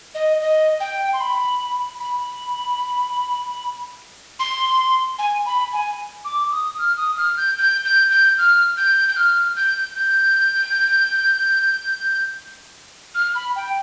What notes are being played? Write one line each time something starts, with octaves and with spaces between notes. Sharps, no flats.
D#5
D#5
G5
C6
B5
B5
C6
G#5
B5
G#5
D6
D#6
F6
D#6
F6
G6
G6
G6
G6
F6
G6
G6
F6
G6
G6
F6
B5
G5